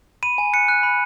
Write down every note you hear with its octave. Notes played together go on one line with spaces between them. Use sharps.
B5 D#7
G#5
F#6 C#7
F#6
B5